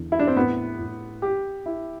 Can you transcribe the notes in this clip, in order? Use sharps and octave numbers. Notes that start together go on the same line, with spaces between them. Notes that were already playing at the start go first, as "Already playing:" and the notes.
Already playing: E2 D3
E4
D4
C4
A2 B3
A2
G4
E4